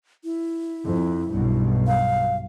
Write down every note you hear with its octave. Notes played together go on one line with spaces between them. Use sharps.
E4
F2
B1 G2 B2
F5